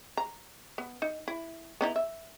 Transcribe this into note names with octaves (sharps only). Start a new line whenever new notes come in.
A#5
B3
D#4
E4
B3 D#4 E4
E5